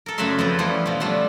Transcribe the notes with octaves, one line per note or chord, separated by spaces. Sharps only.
A4 A#4
F#2 C#3 A3 F#4 E5 C6
F2 B3 C4 B4
E3 F3 G3 A3 B3 C#4
B2 F3
F3 G3 A3 D4